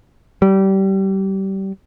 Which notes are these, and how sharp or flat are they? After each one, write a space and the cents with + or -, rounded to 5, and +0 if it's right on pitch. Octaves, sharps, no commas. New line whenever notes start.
G3 -25